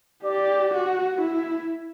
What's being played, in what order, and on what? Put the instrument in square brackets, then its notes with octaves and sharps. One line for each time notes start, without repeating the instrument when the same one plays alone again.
[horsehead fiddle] G4 [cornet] D5
[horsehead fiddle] F#4
E4